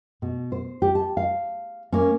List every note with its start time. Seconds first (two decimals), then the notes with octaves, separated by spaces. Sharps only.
0.22 B2
0.52 C5
0.82 G4
0.95 A5
1.17 F5
1.92 A#3 C#4